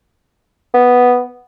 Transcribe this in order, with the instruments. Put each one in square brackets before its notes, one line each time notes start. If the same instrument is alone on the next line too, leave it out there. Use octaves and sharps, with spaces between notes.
[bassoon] B3